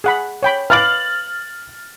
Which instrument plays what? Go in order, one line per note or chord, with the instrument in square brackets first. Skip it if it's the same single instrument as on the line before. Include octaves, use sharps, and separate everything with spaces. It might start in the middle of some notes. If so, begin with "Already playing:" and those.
[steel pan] G#4 F#5 B5
C#5 G5 B5
[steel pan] B4 F5 D6 [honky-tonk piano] F6 A6 F#7